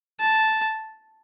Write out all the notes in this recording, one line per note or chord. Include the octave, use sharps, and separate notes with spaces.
A5